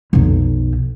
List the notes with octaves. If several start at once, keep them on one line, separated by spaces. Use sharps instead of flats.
B1 F2